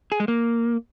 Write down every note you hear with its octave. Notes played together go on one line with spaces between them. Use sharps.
G#4
G#3
A#3